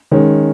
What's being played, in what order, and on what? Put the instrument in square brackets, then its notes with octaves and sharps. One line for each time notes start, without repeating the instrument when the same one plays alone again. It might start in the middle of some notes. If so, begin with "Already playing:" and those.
[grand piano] D#3 G#3 C#4